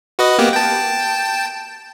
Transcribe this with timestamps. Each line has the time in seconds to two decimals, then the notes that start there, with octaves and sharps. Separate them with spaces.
0.19 F#4 B4 D#5
0.39 A#3 B3 G4
0.53 G5 A5